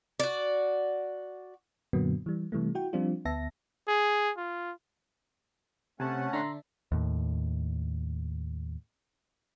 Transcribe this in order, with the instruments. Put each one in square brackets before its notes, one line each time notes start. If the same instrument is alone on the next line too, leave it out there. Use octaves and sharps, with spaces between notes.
[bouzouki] F#4 D5
[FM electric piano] F#2 A#2 D3 F#3 A#3 B3
E3 G3
C3 E3 G3 A3
E4 F#4 G5
F3 G3 C4 D4 F4
D2 B3 E5 A5 A#6
[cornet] G#4
F4
[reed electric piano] C3 [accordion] A3 C#4 F#5 [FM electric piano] G#5 A5
[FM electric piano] D3 D4 E5 [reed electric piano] A#5 C6
[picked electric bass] D#2 A2